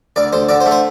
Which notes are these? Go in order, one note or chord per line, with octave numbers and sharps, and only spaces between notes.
D2 D5
D2 C5
D3 D5
C5
A3
C5